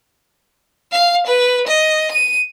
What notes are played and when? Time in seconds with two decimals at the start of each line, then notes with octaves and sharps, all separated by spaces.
0.92 F5
1.27 B4
1.67 D#5
2.12 D#7